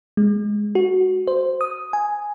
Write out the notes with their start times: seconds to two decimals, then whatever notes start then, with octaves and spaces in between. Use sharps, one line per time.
0.17 G#3
0.75 F#4
1.27 C5
1.61 D#6
1.93 G#5